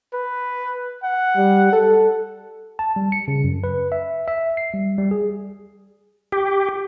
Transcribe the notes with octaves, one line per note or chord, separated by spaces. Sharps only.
B4
F#5
G3
A4
A5
G3
C#7
C#3
F#2
B4
E5
E5
C7
G3
G3
G#4
G4